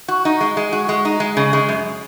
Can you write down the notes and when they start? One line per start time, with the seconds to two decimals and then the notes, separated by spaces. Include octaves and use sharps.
0.08 F#4
0.25 D#4
0.41 G#3
0.57 G#3
0.73 F#4
0.89 G#3
1.05 D#4
1.20 G#3
1.37 C#3
1.53 G#3
1.69 F#2